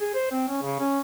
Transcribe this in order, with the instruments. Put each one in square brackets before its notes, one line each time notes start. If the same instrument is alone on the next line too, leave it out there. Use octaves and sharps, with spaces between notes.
[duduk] G#4
C5
C4
C#4
C#3
C#4